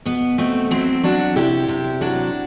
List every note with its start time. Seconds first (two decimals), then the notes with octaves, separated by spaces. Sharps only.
0.05 B2 B3
0.38 B2 A3 C4
0.71 F#3 C4 E4
1.03 F#3 D4 F#4
1.36 C3 E4 G4
1.69 C3
2.01 F#3 D4 F#4